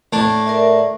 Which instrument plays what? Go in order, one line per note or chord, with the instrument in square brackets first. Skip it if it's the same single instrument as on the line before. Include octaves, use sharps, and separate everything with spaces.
[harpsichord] A2 D4
[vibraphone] A#4 D5 E5